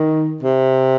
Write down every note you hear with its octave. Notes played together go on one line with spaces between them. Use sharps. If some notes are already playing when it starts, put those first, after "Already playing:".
Already playing: D#3
C3